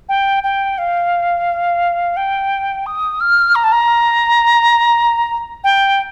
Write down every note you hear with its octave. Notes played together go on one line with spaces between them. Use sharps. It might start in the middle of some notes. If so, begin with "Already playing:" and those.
G5
G5
F5
G5
D#6
F6
A#5
A5
A#5
G5